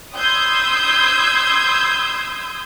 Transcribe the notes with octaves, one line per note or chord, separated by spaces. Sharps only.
B5 C6 D#6 E6 G6 G#6